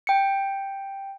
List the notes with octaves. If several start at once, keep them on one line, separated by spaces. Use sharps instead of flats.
G5 C#7